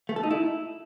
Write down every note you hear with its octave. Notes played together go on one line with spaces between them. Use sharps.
A3
A4
D#4
E4